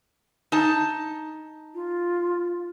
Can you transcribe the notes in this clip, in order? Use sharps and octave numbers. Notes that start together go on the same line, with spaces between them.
D#4 A5
F4